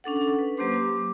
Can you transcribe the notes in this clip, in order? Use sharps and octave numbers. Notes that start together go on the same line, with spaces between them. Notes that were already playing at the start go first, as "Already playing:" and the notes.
C#4 D4 A4 F#5
B4
F#3 A#3 G4 C5 C6 D6
D6